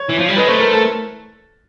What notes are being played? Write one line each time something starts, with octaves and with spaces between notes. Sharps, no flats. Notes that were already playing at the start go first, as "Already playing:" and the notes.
Already playing: C#5
E3
F3
G3
G#3 B4
A3 C5
A#4
A4